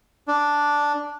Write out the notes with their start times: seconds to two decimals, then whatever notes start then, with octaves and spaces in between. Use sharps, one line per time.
0.28 D4